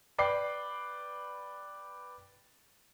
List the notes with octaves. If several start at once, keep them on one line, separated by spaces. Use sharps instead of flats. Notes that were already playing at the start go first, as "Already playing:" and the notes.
B4 D5 G5 D6 C7